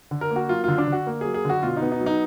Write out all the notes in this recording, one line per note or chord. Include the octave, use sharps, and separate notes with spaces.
D3
A#4
A#3
F#4
F#3 F4
D3 F4
D4
D3 F#4
A#3
F#3 G#4
G#4
D3 F#4
B2 F4
D#4
B3
D#4
F#3
D#4